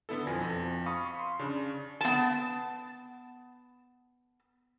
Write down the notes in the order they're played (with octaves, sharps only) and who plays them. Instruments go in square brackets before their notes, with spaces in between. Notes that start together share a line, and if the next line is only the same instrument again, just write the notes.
[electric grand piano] D3 B3 E4 A4
F2 B2 F3 G#5 A#6
F2
F5 B5 C#6 D#6
C6
C#3 D4
[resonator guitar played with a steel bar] B3 A5